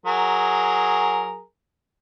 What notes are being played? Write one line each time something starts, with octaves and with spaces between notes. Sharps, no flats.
F#3 G#4 A#4